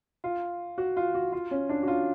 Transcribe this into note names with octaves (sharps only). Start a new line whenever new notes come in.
F4
F#4
F4
F#4
F4
C#4
D4
F#4
F4